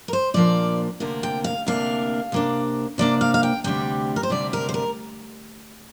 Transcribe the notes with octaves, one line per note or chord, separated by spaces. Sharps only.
A#4
C5
A#2 F3 A#3 D4 D5
D2 C3 A#3 D4
G5
F5
D2 C3 A#3 D4 F5
C3 A#3 D4
C3 A#3 D4 D5
F5
F5
G5
D2 C3 G3 D4 G5
A#4
C5
D2 C3 G3 D4 D5
A#4
C5
A#4